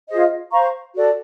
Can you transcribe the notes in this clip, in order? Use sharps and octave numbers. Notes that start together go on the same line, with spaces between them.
F4 G#4 C5 D#5
C5 F5 A#5 C#6
F#4 A4 D5